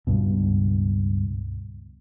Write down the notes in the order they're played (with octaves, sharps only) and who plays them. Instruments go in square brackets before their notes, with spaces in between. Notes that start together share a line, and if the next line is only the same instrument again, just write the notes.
[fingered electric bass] C#2 G2 B2